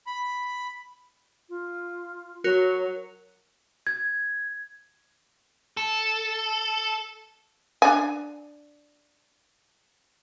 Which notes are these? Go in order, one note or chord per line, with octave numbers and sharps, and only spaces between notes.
B5
F4
F#3 F#4 A#4 F7
G#6
A4
D4 G#5